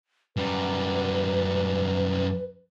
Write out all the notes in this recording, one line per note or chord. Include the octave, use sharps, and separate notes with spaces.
F#2 G3 B4